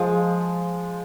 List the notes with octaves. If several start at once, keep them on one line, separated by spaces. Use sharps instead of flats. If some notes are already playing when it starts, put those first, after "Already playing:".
Already playing: F3 G#3